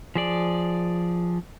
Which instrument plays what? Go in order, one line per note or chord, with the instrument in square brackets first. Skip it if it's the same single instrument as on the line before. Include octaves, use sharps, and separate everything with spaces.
[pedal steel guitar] F3 G#4 D5